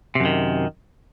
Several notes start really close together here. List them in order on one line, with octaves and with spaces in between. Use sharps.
C3 F#2 D#3